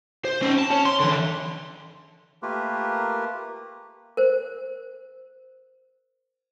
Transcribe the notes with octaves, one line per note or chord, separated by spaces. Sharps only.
C5
C#4 C5
A5
C#4 C#5
C6
D3 E3
A3 A#3 F4 G4 A#4 B4
A#4 C5